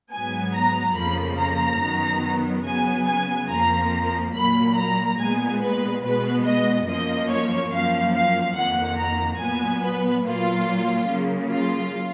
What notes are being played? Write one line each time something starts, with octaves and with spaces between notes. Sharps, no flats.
G#2 F#3 B3 G#5
A#5
F2 C#3 F3 A#3 B5
A#5
F#2 D#3 F#3 B3
C#3 F#3 B3 G#5
G#5
F2 F3 A#3 A#5
A#2 F#3 A#3 B5
A#5
A#2 G#3 B3 G#5
B4
B2 G#3 B3 B4
D#5
F#2 F3 A#3 D#5
C#5
F#2 F3 A#3 F5
F5
F2 D#3 A#3 F#5
A#5
A#2 F#3 B3 G#5
B4
A#2 F#3 A#3 F4
C#3 F#3 A#3
F4